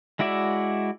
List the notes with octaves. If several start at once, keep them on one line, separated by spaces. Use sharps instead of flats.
G#3 E4 F#4 D5 E5